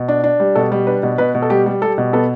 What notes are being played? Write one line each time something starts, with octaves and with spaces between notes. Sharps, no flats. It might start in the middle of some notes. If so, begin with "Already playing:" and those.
Already playing: B2
D4
D4
G3
B2 A4
G3
D4 B4
B2
B2 B4
B2
A4
G3 G4
G3
G3 A4
B2
B3 A4